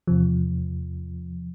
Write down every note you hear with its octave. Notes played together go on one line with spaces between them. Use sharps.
E2 C3 F3